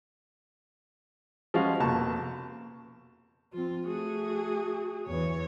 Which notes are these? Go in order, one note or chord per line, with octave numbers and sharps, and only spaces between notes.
F3 G3 G#3 C#4 F#4 F5
F1 B2 A#3 A5 C#6
F3 C4 F4
A3 F#4 G#4
E2 E3 C#5